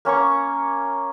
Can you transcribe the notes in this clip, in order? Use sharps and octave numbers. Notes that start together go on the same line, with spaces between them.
A#3 C#4 A#5 C#6